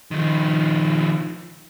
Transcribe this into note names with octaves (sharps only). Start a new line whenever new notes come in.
D#3 F3